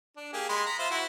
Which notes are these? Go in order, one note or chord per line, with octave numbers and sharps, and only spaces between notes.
D4
A#3 G4 G#4
G#3 B5 C6
A#5 B5
F4 C5 E5
E4 F#4